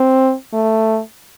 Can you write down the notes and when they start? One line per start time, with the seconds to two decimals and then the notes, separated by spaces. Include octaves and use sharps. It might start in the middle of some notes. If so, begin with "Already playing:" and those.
Already playing: C4
0.53 A3